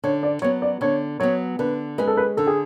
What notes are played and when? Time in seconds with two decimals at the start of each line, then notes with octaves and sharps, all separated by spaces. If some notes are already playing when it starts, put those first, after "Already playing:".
0.04 D3 C#5
0.23 D5
0.42 F#3 B3 C#5
0.62 D5
0.81 D3 C#5
1.20 F#3 B3 C#5
1.59 D3 B4
1.98 G#3 C#4 G#4 B4
2.08 A4
2.17 B4
2.37 D3 A4
2.47 G#4